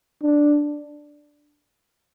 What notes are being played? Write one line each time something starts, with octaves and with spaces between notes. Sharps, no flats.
D4